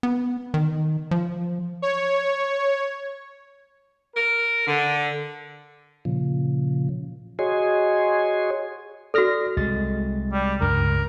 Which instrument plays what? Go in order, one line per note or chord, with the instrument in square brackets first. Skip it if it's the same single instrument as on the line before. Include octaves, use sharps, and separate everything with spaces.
[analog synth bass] B3
D#3
F3
[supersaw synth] C#5
[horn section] A#4
D3
[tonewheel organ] A#2 C#3 F3
F#4 G#4 C#5 D#5 G#5 C6
[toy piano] F#4 A4 [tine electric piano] D5 F6 A#6
[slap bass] C2 [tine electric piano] G#3 A6
[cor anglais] G3
[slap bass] C#2 [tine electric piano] G2 [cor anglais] A#4